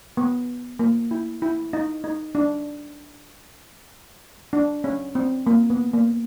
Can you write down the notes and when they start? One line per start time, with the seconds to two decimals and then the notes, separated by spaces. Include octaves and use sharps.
0.17 B3
0.79 A#3
1.11 E4
1.42 E4
1.73 D#4
2.04 D#4
2.35 D4
4.53 D4
4.84 C#4
5.15 C4
5.47 A#3
5.70 B3
5.94 A#3